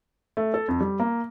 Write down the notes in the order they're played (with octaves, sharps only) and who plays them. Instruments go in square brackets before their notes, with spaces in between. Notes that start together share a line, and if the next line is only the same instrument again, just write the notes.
[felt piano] A3
A4
F2
G3
A#3